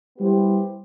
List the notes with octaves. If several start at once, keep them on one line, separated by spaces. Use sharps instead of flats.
G3 B3 E4 G4 C5